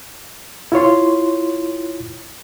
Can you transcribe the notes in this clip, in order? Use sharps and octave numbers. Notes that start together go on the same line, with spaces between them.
E4 F4 C#5 C6